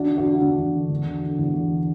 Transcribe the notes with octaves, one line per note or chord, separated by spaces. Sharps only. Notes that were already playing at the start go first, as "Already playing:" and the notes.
Already playing: E2 D4 F#4
D3
D4 F#4
D3
E2 D4 F#4
E2
D3
E2
D3
D3
E2
E2
D3